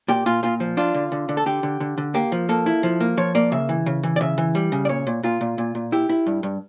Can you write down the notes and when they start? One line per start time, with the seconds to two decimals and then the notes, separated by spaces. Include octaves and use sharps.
0.08 A#2 G4
0.26 A#2 F4
0.43 A#2 F4
0.60 F3
0.77 D4 F4
0.94 D3
1.12 D3
1.29 D3
1.37 A4
1.46 D3 G4
1.63 D3
1.80 D3
1.98 D3
2.14 A#3 G4
2.32 F3
2.49 A#3 A4
2.66 E4
2.83 F3
3.00 A#3
3.17 F3 C#5
3.35 A#3 D5
3.52 C#3 E5
3.69 E3
3.86 C#3
4.03 E3
4.16 D5
4.21 C#3 E5
4.38 E3
4.55 G3
4.72 C#3
4.85 D5
4.89 A#2 C#5
5.07 A#2
5.23 A#2 F4
5.41 A#2
5.58 A#2
5.75 A#2
5.92 E4 G4
6.09 E4
6.26 G2
6.43 G2